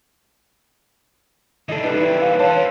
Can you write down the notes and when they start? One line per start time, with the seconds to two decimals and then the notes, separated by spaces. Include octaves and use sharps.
1.69 E3 D4 A4 D#5
1.83 G3 D#4 B4
2.01 E4 C#5
2.21 F5
2.40 A4 C5 C#5 A5